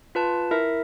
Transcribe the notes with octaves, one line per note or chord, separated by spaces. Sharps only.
F4 B4 A5
E4 A#4 E5